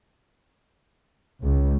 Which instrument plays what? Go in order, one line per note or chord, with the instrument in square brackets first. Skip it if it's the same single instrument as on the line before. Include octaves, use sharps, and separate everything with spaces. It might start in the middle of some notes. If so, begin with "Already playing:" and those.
[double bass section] C#2